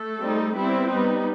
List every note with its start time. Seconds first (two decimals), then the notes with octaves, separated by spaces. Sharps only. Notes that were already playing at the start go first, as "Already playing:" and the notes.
Already playing: A3 A4
0.20 G3 C4 D#4
0.55 G3 B3 C4 E4 B4
0.91 G3 B3 D#4